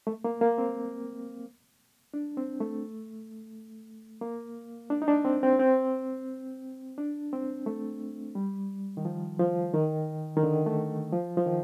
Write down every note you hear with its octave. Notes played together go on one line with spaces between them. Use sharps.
A3
A#3
A#3
C4
D4
C4
A3
A#3
D4
D#4
D4
C4
C4
C4
D4
C4
A3
G3
D#3
F3
F3
D#3
D#3
D3
A3
F3
F3
D#3